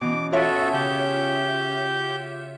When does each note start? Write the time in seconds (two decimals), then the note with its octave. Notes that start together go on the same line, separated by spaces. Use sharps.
0.01 B2 E3 C#4 D6
0.32 F4 F#4 A4 B4 C#5 E5 D#6
0.73 C#3 G4 F#5 G6